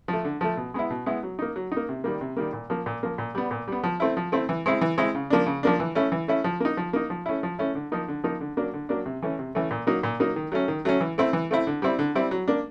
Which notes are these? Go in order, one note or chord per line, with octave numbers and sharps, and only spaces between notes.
F3 A3
D3
F3 A3
B2
G#3 B3 E4
B2
G#3 B3 E4
F#3
A#3 D#4
F#3
D#4
A#3
C3
D#3 G3 A#3
C3
D#3 G3 A#3
A#2
F3 A#3
A#2
F3 A#3
A#2
G3 B3
A#2
G3 B3
F3
A3 C4 E4
F3
A3 C4 E4
E3
G#3 C4 E4
E3
G#3 C4 E4
C#3
F3 A#3 D4
C#3
F3 A#3 D4
E3
A3 C#4 E4
E3
A3 C#4 E4
F3
A#3 D#4
F3
A#3 D#4
F3
A3 C#4 E4
F3
A3 C#4 E4
D3
F3 A#3 D#4
D3
F3 A#3 D#4
D3
F#3 A#3 D4
D3
F#3 A#3 D4
C3
E3 A3 C#4
C3
E3 A3 C#4
A#2
F#3 A#3 D#4
A#2
F#3 A#3 D#4
D#3
F#3 A3 C#4
D#3
F#3 A3 C#4
E3
A3 C4 E4
E3
A3 C4 E4
D3
G3 C4 E4
D3
G3 C4 E4
F#3
A#3 D4